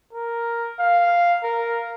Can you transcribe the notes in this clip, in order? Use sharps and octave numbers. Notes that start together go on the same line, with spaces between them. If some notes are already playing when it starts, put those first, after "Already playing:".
A#4
F5
A#4